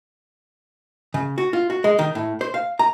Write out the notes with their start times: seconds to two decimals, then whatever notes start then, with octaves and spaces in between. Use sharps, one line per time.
1.14 C#3
1.38 F#4
1.53 F4
1.70 F#4
1.84 G#3
1.99 D#3
2.15 A2
2.41 C5
2.54 F5
2.79 A#5